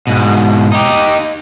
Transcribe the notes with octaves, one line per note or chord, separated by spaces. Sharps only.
G#2 B2
D#4 G4